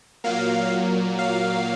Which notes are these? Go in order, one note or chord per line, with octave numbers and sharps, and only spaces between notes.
A#2 F#3 A#3 F5
F5